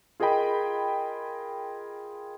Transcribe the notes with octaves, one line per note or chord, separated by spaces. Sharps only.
F4 G#4 A#4 D#5 G5 B5